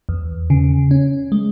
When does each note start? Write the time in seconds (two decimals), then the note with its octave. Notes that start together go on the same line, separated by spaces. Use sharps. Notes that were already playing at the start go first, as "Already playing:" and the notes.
0.09 E2
0.50 C#3
0.91 C#4
1.32 G#3